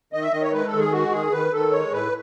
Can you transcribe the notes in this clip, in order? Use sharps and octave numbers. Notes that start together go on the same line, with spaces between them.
D#3 D#5
E5
D#3 D#5
C#5
G#3 B4
A4
D#3
G#4
G#3 F#4
D#3 G#4
D#3 B4
D#3 A4
G#3 C#5
A2 B4